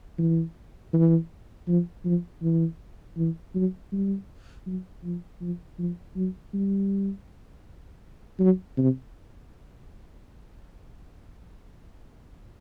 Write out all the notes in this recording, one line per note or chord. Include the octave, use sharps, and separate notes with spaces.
E3
E3
F3
F3
E3
E3
F#3
G3
F#3
F3
F3
F3
F#3
G3
F#3
C3